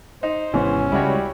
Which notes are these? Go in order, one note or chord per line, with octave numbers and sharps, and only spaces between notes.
D#4 C5
G#1 C3 E3 B3 C#4
C#2 G3 G#3 E4 F#4 C#5